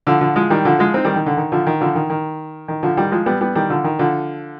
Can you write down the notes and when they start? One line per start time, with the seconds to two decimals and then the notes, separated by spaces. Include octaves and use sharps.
0.07 D3 F3
0.21 D3 F3
0.36 F3 G#3
0.50 D#3 G3
0.65 D3 F3
0.79 F3 G#3
0.94 C4 D#4
1.05 D#3 G3
1.15 D#3
1.26 D3
1.37 D#3
1.52 D3 F3
1.66 D#3
1.81 D3 F3
1.95 D#3
2.10 D#3
2.68 D#3
2.83 D3 F3
2.97 D#3 G3
3.12 F3 G#3
3.26 G3 B3
3.41 G3 B3
3.55 D#3 G3
3.70 D3 F3
3.84 D#3
3.99 D3 F3